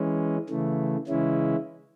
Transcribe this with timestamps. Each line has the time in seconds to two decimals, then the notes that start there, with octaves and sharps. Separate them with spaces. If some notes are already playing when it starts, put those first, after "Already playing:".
Already playing: E3 G#3 C#4
0.49 C#3 E3 A3
1.08 C#3 E3 G#3 C#4 E4